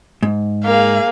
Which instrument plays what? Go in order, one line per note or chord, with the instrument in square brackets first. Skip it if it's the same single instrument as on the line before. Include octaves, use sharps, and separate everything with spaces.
[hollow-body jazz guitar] G#2
[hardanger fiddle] A#3 G#4 [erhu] F5